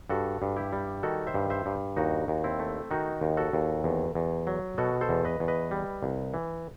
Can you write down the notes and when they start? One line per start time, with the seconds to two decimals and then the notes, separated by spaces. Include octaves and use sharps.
0.10 G2 F#4 A4
0.42 G2
0.57 E4 G4
0.73 G3
1.03 D#3 F#4 A4
1.27 C5 E5
1.34 G2
1.50 C5 E5
1.66 G2
1.97 D#2 D#4 F#4
2.28 D#2
2.44 C4 E4
2.59 A3
2.91 D#3 D#4 F#4
3.21 D#2
3.37 F#4 A4
3.53 D#2
3.84 E2
4.15 E2
4.47 F#3
4.78 B2 F#4 A4
5.01 A4 C5
5.09 E2
5.25 B4 D#5
5.40 E2
5.48 B4 D#5
5.71 G3
6.03 C2
6.34 E3